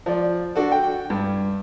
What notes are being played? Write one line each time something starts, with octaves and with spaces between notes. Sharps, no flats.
F3 D5
D4 F#4 A4
G5
G2